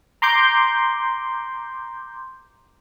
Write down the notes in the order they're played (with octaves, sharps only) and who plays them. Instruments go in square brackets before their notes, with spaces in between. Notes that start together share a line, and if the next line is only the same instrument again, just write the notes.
[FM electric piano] A#5 C6 D6 G6